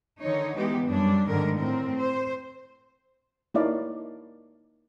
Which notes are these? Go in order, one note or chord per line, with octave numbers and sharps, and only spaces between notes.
D3 D#3 D#4 C#5
E3 G#3 B3 D#4 G4
F#2 G3 D4
G#2 D3 D#3 G#3 A#4
A2 C4 A#4
C5
A#3 D#4 E4 C#5 D5 F5